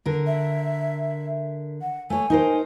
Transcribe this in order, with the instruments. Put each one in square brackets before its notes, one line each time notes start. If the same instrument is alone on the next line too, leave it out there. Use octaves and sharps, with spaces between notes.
[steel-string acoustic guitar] D3 A#4
[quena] E5
F#5
[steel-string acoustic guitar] A3 C#5 [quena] G#5
[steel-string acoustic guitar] D#4 A#4 C5